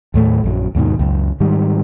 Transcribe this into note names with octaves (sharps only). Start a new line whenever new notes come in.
D#2 A2 A3
A#1 F#2 F#3
D#2 G#2 B2 D#3
C#2 F#2
G#2 D#3 G3